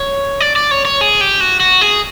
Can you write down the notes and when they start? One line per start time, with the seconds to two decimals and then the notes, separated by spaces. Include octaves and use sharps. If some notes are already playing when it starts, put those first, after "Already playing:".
Already playing: C#5
0.40 D5
0.56 D5
0.71 C#5
0.85 C#5
1.01 G#4
1.21 G4
1.41 F#4
1.60 F#4
1.81 G#4